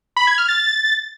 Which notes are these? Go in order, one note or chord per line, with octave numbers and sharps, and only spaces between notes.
B5
G#6
F6
A6